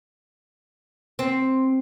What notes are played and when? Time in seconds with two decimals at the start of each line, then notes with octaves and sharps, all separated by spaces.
1.19 C4